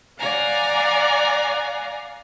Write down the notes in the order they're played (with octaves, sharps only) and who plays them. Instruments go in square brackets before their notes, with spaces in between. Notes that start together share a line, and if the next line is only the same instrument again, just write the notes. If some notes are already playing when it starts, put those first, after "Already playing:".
[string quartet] D5 F5 F#5 G#5 A#5